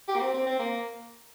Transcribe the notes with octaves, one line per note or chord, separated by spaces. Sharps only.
G4
A#3
C4
C4
C4
A#3